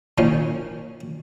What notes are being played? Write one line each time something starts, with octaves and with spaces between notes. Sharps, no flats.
A#2 D#3 F3 C#4